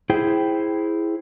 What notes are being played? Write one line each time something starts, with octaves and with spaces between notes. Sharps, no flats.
E4 G#4 C5 G5